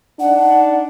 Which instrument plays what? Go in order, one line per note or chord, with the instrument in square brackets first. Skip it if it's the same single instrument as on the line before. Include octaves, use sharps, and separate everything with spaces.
[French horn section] D4 D#4 [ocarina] F#5